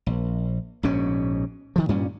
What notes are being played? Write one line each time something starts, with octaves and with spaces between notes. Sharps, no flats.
A#1
A#1 G#2 B2 C#4
D#3 F3
G2 A#2 G3 C#4